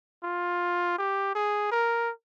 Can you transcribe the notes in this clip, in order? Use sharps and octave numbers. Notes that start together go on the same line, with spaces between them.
F4
G4
G#4
A#4